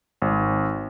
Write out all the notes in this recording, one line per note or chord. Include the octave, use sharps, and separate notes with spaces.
G#1